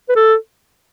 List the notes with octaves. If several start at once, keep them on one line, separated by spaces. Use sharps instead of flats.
B4
A4